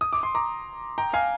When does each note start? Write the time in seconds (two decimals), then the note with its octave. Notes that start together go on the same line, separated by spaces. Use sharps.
0.01 D#6
0.13 D6
0.23 C6
0.35 A#5 D6
0.98 G5 A#5
1.13 F5 G#5